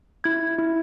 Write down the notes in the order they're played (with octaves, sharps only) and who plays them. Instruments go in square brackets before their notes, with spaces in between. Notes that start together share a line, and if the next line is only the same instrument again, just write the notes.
[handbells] E4 G#6
E4